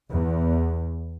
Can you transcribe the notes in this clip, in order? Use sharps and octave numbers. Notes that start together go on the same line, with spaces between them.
E2